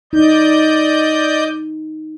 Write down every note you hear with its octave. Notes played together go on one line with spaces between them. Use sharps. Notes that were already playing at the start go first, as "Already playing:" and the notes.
D#4 D5 D#5 G6